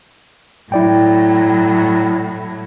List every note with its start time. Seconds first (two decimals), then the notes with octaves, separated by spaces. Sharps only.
0.72 A2 F#3 E4 D5 G5